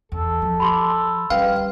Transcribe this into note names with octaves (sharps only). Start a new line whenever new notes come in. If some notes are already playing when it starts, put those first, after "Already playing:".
E2 A4
F3
B5 C6 D6
G3 C#4 B4 F5